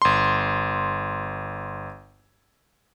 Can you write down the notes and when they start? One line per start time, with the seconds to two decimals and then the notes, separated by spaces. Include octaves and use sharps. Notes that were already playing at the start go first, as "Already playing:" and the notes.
0.02 G1 C6